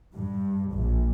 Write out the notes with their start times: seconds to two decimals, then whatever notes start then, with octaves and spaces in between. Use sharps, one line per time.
0.13 G2
0.73 A#1